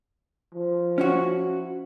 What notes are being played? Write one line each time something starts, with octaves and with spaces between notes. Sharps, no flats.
F3
C#4 E4 F#4